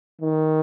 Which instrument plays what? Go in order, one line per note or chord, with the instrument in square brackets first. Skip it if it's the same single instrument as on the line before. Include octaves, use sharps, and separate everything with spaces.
[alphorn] D#3